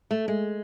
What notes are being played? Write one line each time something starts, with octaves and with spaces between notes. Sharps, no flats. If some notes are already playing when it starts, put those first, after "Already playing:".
A3
G#3